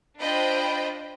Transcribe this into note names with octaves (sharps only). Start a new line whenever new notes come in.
D4 F4 C5 D#5 G5 B5